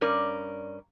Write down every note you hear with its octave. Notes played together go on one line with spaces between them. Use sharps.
G2 C#4 A#4 D5